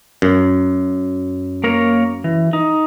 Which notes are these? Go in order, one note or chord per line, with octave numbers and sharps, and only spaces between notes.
F#2
A#3 A#4 C#5
E3
D#4